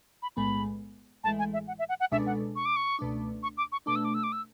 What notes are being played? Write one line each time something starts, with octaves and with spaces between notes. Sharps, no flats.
B5
B1 A2 G#3 B3 B5
A1 A2 E3 G#3 A5
G#5
E5
F#5
E5
F#5
F#5
C#2 B2 G#3 D4 A4 E5
F#5
C#6
D6
C#6
C#2 B2 A3 D4
C#6
D6
C#6
B2 A3 D4 D6
E6
D6
E6
D6
E6